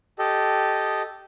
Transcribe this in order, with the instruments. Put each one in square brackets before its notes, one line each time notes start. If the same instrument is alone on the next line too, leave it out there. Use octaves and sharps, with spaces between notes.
[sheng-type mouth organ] G4 A4 D#5